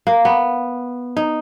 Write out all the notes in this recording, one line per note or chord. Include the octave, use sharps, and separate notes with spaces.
A#3
B3
D#4